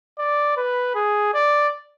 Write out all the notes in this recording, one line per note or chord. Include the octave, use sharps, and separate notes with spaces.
D5
B4
G#4
D5